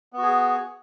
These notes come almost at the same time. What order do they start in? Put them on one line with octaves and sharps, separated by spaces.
B3 F#4 G#4